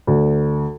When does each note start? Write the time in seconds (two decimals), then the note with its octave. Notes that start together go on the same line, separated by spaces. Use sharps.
0.07 D2